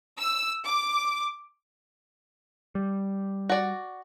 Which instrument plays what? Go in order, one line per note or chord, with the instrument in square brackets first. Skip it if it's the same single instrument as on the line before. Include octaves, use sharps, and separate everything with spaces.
[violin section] E6
D6
[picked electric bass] G3
[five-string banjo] F#4 D5